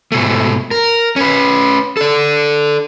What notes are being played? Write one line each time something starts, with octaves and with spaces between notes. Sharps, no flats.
G#2 B2 A3
A#4
C#4 B4
A4 D5